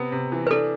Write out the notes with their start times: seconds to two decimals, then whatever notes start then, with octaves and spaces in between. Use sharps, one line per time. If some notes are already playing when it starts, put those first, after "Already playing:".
Already playing: C3 B3
0.12 C3
0.32 E3
0.47 B4
0.51 D4 A4